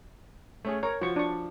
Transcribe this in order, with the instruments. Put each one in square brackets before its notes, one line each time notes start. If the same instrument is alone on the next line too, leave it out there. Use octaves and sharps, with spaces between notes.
[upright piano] A3 C#4 G#4
[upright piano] A#4 A#5 [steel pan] C#5
[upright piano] F3 [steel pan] F#4 C#6
[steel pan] D4 C#6